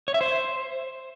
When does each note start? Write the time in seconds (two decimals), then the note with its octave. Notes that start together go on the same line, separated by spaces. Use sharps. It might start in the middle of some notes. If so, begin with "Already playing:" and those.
0.08 C#5
0.14 E5
0.21 C5